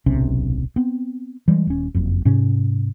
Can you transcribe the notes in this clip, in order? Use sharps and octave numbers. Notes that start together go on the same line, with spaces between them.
D1 B1 C3 C#4
B3 C4
E3 G3 G#3
D#1 C#4
F#1 F2
G#2 C3 C#4